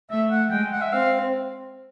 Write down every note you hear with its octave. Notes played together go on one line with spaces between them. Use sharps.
A3 E5
F#5
G#3 G5
F#5
E5
C4 F5